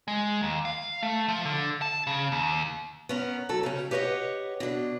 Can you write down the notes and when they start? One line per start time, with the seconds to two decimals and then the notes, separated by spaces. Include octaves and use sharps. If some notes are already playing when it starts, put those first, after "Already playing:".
0.08 G#3
0.43 D#2
0.65 F5
1.02 A3
1.28 F3
1.45 D3
1.82 A5
2.07 C#3
2.32 D#2
3.09 B3 C#4 A#4
3.49 F#3 A4
3.63 C#3 G3 C#4
3.91 G4 B4 C#5 D#5 F#5
4.60 B2 D4